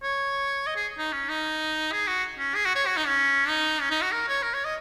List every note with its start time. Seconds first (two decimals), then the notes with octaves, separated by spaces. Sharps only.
0.03 C#5
0.67 D#5
0.76 G#4
0.98 D#4
1.13 C#4
1.29 D#4
1.92 G#4
2.08 F#4
2.39 C#4
2.55 G#4
2.66 F#4
2.75 C#5
2.87 F#4
2.97 D#4
3.07 C#4
3.49 D#4
3.81 C#4
3.91 D#4
4.02 F#4
4.12 A#4
4.28 C#5
4.43 A#4
4.54 C#5
4.65 D#5